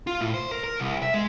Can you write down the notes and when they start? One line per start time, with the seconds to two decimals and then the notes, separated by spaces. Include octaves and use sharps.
0.07 F4
0.21 A2
0.34 C5
0.51 A#4
0.64 A#4
0.80 C2
1.03 E5
1.14 G#3